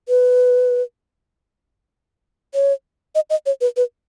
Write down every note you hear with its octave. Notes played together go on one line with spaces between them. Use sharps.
B4
C#5
D#5
D#5
C#5
B4
B4